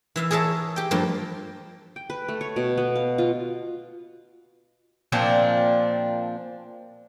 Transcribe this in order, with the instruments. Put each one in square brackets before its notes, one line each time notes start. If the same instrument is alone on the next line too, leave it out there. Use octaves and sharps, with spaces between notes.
[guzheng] E3 E5 F5
G#4 A#4 C#5 E5 A5
G4 G5
G2 F3 A3 A#3
[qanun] G5
B4
A3
C#5
B2
B3
F5
F4
[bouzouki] A#2 F3 C4 D4